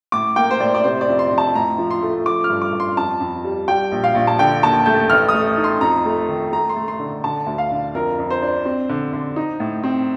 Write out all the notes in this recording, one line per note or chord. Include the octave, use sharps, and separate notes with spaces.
A2 D6
A#3 G5
C5
A2 D5
D5
C3 C5
D5
F2
C6
F2
A5
A2 A#5
F3
C6
A3
F3 D6
F6
G2
D6
G2
C6
F2 A5
F2
G3
G3 G5
A#1
F5
A#1
A5
D3 G5
D#2 A5
A3 G6
A1 F6
D#6
A3
D#4
C6
F2 A#5
A3
D#3
A3 A#5
C6
A3
C6
D3
D3 A5
D2
F5
D3
F2 A#4
F2
C5
D4
C4
D3
D3
D#4
A2
C4